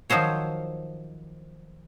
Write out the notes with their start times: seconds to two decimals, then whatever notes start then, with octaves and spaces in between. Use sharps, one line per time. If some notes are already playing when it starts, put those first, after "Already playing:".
0.10 D#3 F3 F#3 C5 C#5